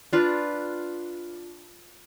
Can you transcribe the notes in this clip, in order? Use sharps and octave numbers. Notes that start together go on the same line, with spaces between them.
D4 F4 B4